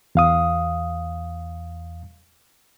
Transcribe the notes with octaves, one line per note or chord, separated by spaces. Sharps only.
E2 F5 D#6